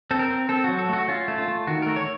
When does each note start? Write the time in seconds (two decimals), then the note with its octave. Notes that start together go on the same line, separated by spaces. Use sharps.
0.11 C4 A4
0.19 A#4
0.30 C4
0.49 C4 A4
0.64 F#3 F#4
0.78 A4
0.89 A3 F#4
1.08 C#4 F4
1.28 A3
1.38 F4
1.48 A3
1.67 D#3 F#4
1.82 A3 A#4
1.96 C#5